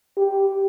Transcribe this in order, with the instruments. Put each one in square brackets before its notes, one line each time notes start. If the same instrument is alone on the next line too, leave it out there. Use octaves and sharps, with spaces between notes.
[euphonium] G4